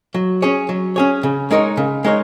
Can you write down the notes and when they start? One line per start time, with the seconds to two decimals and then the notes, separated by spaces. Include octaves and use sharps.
0.14 F#3
0.42 C#4 G#4 C#5
0.69 F#3
0.96 C#4 G#4 C#5
1.23 C#3
1.51 G#3 D#4 A#4 C#5
1.77 C#3
2.04 G#3 D#4 A#4 C#5